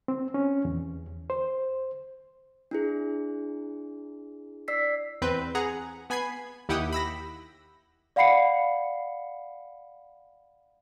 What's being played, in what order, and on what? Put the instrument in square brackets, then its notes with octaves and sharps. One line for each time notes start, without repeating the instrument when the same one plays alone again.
[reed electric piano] C4
C#4
E2
C5
[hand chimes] D4 E4 G#4
D5 E6 B6 C7
[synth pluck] E2 C4 B4 G6
G#4 F#5 A#5
B3 G#5 B5 G#6 C7
D#2 E4 G4 F#5 G5 D#6
B5 E6 A#6
[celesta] D5 F5 F#5 B5 C7 C#7